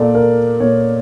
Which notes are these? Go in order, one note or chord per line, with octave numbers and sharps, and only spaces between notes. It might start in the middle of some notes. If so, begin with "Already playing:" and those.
Already playing: A#2 A4 D5
A#4
A#2 C#5